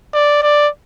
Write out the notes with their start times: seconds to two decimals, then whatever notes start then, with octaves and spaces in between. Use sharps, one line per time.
0.14 D5
0.43 D5